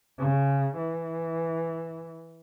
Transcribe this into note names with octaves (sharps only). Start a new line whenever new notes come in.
C#3
E3